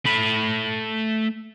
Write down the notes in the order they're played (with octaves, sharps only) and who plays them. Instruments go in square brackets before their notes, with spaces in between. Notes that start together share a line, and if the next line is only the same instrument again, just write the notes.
[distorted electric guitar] A3 B5